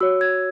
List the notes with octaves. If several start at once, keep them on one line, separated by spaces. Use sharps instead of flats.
F#4 C#5 E6
G#6